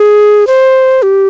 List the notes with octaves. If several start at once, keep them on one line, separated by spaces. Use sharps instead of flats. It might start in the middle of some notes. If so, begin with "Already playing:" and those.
Already playing: G#4
C5
G4